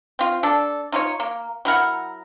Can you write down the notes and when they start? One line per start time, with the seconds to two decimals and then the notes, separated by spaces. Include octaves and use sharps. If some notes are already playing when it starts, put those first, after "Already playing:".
0.19 C4 F4
0.43 D4 A4
0.92 D#4 F4 A4 C#5
1.20 A#3
1.65 F#3 E4 A#4 F#5